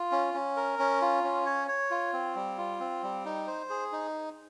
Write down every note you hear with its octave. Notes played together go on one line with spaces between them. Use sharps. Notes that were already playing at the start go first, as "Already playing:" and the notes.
Already playing: F4
C#4
C#4
A#4
C#4
F4
C#4
C#5
C#5
F4
C4
G3
F4
C4
G3
D#4
C5
G#4
D#4